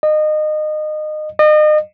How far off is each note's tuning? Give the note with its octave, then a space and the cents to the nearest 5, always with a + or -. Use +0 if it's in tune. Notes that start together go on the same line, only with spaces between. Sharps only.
D#5 -25
D#5 -35